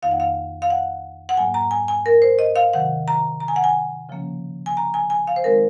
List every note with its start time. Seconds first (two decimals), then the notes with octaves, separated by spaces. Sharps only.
0.02 F2 D#3 A#3 D#4 F5
0.11 F#5
0.20 F5
0.62 F5
0.70 F#5
1.29 F#5
1.37 G#2 F#3 A#3 G#5
1.54 A#5
1.71 G#5
1.88 G#5
2.06 A#4
2.22 C5
2.39 D#5
2.56 F5
2.73 C3 D#3 F#3 F#5
3.08 A#5
3.40 A#5
3.48 G#5
3.56 F#5
3.64 G#5
4.09 C#3 F3 A#3 C#4
4.66 G#5
4.77 A#5
4.94 G#5
5.10 G#5
5.27 F5
5.36 C5
5.44 D#3 G#3 C4 D#4 A#4